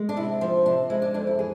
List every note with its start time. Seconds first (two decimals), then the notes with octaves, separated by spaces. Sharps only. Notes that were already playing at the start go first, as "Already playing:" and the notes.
Already playing: G#3
0.09 D4
0.17 C3 E4
0.41 F3
0.66 C3 D4
0.90 G#3 E4
1.02 D4
1.14 F2 D4
1.27 E4
1.39 E3 G#4